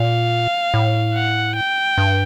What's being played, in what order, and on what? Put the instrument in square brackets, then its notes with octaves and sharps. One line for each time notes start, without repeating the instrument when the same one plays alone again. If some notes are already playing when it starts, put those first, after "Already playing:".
Already playing: [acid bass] A#2 [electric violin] F5
[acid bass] A2
[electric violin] F#5
G5
[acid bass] G2